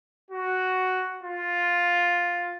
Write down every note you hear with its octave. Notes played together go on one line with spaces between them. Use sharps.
F#4
F4